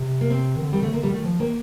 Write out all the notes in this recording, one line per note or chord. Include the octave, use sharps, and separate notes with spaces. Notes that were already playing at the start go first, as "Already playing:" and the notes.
Already playing: C3
A#3
C4
D#3
D3
D#3 G3
D3 A3
D3 A#3
D3 G3
D#3
A3
F3
D#3 A#3